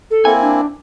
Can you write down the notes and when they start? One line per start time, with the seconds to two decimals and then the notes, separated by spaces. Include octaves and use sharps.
0.11 A4
0.25 A#3 C4 E4 G#5
0.42 D4